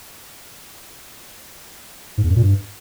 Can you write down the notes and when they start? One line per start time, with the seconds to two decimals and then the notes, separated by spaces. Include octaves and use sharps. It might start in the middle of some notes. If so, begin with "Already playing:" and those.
2.18 G#2
2.24 E2
2.30 F#2
2.36 A#2
2.42 G2